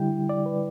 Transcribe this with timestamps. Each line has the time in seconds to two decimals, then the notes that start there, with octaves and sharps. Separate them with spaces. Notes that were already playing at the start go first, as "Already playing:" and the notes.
Already playing: D3 G3 E4 G5
0.29 D5
0.46 B4